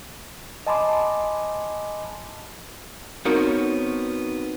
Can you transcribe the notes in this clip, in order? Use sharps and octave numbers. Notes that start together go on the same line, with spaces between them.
D#5 G#5 A5 B5 C6 D6
B3 C4 D#4 F#4 A#4 C#5